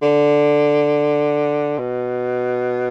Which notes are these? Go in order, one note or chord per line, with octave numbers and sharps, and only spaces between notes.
D3
B2